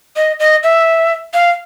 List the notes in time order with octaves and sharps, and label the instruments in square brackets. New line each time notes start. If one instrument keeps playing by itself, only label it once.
[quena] D#5
D#5
E5
F5